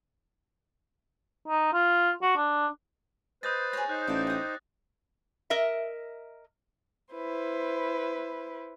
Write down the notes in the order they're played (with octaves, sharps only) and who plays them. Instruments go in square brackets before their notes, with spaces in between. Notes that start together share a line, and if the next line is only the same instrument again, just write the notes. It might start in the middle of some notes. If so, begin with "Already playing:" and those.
[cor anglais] D#4
F4
F#4
D4
[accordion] B4 C5 [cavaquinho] D#5 [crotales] D#6 G6 A6
[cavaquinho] G#4 C#5 [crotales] A#6
[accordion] D#4 C5 [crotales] F#6
[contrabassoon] A1 [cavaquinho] D5 A5
[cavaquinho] G4 D#6
[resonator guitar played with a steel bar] A#4 D#5 E5
[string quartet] E4 B4 C5